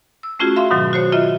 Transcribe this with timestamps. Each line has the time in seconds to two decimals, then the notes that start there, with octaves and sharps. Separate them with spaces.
0.23 E6
0.39 A3 C#4 F4 F#4 G#4
0.56 E5 F5 C6
0.70 G#2 B2 D#3 F#3
0.93 F#4 C5 C#5
1.12 F4 D#5 E5